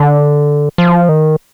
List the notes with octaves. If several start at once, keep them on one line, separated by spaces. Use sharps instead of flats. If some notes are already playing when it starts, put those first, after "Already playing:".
Already playing: D3
F3
D#3